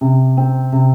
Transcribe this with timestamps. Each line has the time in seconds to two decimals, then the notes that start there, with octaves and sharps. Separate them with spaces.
0.01 C3
0.37 C4
0.72 C3